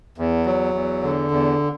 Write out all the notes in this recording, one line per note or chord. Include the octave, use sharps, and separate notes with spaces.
E2
F#3
E2
D3
E2